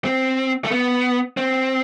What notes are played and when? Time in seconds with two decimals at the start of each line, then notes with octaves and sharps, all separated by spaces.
0.05 C4
0.64 A3
0.71 B3
1.37 C4